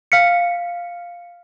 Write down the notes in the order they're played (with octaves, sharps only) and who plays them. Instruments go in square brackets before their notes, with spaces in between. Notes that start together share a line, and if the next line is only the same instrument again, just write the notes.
[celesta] F5 F6 B6 C#7